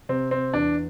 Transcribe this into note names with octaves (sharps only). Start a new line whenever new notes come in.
C3 C4
C4
E2 D4